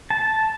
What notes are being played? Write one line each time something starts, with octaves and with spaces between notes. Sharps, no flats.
A5